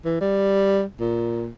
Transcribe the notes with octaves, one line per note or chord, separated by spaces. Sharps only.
E3
G3
A#2